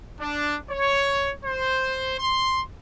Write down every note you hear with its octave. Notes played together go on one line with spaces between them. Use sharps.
D4
C#5
C5
C6